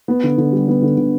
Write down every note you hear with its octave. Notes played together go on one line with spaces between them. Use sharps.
B3
D3
D3
G3
B3
D3
D3